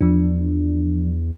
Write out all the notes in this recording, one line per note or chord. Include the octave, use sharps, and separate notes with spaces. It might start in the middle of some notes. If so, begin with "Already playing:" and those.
E2 F3 D4